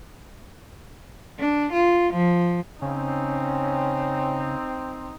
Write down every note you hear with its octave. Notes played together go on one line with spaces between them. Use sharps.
D4
F4
F3
C#3 C4 C#4 D#4